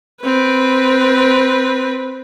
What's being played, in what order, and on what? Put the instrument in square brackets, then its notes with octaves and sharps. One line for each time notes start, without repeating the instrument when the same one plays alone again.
[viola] C4 B4